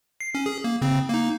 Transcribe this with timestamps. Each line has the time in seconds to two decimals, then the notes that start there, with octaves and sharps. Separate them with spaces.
0.20 C7
0.35 C#4
0.46 G#4
0.64 A#3
0.82 C#3 C4
1.09 A#3 D#4